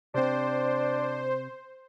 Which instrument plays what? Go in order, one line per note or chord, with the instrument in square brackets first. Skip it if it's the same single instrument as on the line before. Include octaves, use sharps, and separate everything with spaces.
[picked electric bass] C3 C4 [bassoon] D4 [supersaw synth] C5